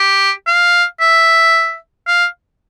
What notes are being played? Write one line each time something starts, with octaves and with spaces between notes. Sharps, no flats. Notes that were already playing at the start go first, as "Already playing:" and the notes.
Already playing: G4
F5
E5
F5